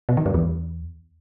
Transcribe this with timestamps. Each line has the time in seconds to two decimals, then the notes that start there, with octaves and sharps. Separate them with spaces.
0.09 B2
0.17 D#3
0.26 G2
0.34 E2